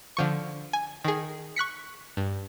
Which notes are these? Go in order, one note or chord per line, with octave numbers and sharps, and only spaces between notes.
D3 F3 C#6
G#5
D#3 G#4
C#6 F#6 B6 C#7
G2